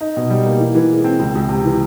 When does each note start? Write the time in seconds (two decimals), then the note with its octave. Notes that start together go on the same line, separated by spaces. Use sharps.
0.01 D#4
0.17 B2
0.30 G3
0.46 A#3
0.60 E3
0.75 E3
0.90 G#3
1.04 C4
1.19 C#2
1.35 C#2
1.49 C3
1.65 E3